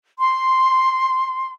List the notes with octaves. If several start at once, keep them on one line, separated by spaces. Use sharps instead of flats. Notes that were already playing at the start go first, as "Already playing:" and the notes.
C6